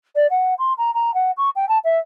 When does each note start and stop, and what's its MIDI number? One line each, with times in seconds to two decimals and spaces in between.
0.15 0.27 74
0.30 0.54 78
0.58 0.73 84
0.78 0.94 82
0.94 1.14 82
1.14 1.31 78
1.37 1.49 85
1.56 1.68 79
1.69 1.78 81
1.84 1.99 76